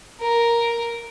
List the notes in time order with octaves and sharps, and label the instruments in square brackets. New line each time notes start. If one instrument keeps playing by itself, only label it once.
[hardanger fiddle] A#4